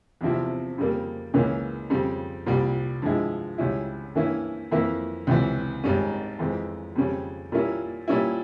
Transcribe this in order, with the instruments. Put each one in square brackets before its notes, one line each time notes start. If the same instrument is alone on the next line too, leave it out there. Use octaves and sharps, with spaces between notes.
[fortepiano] E2 C3 F3 C4 E4
F2 C#3 G3 A#3
C#2 C#3 E3 A#3 C#4
F2 C#3 G3
C2 A#2 G3
G2 F3 G#3 E4
C#2 C#3 G3 C#4 E4
G2 E3 A#3 C#4 E4
F2 E3 A#3 E4
C#2 C3 E3
G#1 G#2 G3 C#4
F2 E3 G#3 C4
F2 C#3 G3 C#4
A#2 G3 A#3 C#4 E4
A#2 G3 C#4 E4